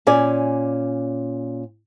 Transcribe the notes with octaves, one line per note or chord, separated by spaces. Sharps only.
A#2 C#4 D5 G#5